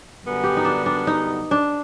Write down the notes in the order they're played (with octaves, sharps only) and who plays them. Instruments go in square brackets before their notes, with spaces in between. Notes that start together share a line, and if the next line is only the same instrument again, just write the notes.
[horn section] F#2 D3 G3 B3
[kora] G4
D#4
D4
D4
D#4
D4